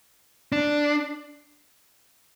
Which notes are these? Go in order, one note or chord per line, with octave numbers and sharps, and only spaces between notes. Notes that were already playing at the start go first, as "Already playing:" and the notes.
D4